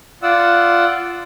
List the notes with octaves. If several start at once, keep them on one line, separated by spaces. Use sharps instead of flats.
F4 D5 F#5 E6